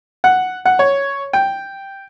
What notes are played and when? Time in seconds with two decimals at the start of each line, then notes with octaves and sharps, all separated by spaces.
0.24 F#5
0.65 F#5
0.79 C#5
1.33 G5